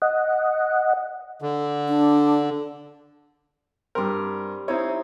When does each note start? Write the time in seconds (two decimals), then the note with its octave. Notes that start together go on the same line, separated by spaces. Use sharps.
0.02 D#5 F#5
1.42 D3
1.88 D4
3.95 G2 G3 C4 A#4
4.68 C4 D#4 E4 C#5 D#5